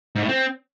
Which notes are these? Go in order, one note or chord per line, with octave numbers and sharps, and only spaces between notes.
G#2
A2
C4